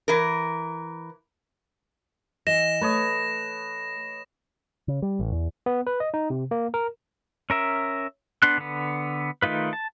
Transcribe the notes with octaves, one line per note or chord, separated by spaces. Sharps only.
E3 A#4
E3 D#5 A#6 E7
A3 B4 C#5 D#5
C#3
G3
A1
E2
B3
B4
D#5
D#4
C3
A#3
A#4
C#4 A#4 E5
B3 D4 C6 F#6
D3 B3
D#3 A3 D#4 F4 B4
A5